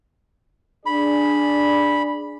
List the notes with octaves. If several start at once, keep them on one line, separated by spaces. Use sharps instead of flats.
D4 G#4 D5 B5